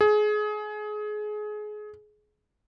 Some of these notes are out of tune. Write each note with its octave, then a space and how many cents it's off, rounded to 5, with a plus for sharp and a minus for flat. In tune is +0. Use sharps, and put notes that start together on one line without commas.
G#4 +25